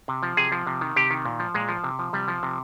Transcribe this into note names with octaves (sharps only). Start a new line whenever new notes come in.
C3
F3
C3 G#4
F3
C3
D#3
C3 G4
D#3
A#2
F3
A#2 G#3
F3
C3
F3
C3 G3
F3
C3